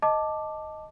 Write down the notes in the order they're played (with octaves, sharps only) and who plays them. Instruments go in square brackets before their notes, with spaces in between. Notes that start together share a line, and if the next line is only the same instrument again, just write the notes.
[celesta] D#5 A5 D6